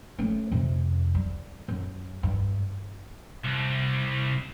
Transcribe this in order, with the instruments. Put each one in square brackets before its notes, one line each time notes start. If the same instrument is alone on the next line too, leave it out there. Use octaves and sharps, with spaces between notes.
[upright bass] A3 C#4
F2 C3
G3
F#2
G2
[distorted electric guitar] C2